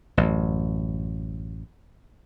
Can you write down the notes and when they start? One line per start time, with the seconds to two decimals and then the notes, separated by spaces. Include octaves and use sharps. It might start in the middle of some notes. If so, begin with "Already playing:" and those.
0.17 A1 F#2